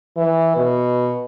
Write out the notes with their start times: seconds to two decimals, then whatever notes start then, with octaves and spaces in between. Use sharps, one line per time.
0.17 E3
0.56 B2